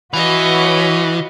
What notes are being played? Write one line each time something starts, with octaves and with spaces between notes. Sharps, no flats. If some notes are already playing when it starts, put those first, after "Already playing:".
E3 F#4 B4 C#5 D#5 F5